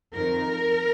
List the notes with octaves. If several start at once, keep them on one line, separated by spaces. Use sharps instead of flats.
F2 D#3 A#4